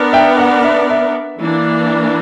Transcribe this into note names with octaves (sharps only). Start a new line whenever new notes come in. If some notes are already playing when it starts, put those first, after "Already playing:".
Already playing: B3 D4 A#4 D5
E5 G5
F#5
E5
E5
E3 A#3 D4